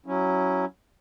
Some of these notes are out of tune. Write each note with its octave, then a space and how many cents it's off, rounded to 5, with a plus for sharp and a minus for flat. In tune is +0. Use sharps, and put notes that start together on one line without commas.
F#3 +0 C#4 +0 E4 +0